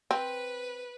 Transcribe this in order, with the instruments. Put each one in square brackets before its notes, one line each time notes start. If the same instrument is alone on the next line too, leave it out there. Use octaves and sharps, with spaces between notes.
[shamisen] C4 [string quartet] B4